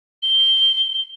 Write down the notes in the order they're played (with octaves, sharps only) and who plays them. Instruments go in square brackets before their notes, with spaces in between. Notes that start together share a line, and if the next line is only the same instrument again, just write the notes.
[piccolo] G7